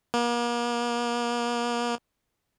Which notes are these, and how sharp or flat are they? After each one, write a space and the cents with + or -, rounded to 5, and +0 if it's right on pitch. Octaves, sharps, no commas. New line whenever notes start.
A#3 +40